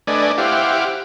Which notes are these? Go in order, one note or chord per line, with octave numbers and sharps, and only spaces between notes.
A3 D4 B4 D5 D#5 G#5
E4 G4 C5 F5 F#5 D6